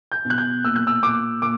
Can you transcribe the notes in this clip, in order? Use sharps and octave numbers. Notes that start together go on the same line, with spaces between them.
G6
B2
F#6
G6
A#2 E6
F#6
E6
A#2 D6
A#2 D6